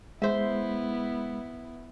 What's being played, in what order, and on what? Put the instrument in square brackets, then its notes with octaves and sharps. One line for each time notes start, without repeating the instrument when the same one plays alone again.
[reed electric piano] G#3 [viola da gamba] B3 E4 [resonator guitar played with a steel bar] C5 E5